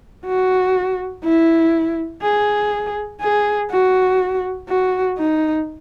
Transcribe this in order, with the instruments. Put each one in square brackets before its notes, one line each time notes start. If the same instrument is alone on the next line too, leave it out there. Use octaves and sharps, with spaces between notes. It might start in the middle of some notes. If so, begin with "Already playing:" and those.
[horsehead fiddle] F#4
E4
G#4
G#4
F#4
F#4
D#4